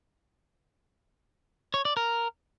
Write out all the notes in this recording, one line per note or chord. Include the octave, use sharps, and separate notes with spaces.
C#5
D5
A#4